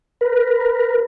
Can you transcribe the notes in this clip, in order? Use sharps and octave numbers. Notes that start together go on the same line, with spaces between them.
A#4 B4